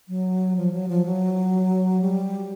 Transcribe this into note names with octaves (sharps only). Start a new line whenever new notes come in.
F#3
F3
F#3
F3
F#3
G3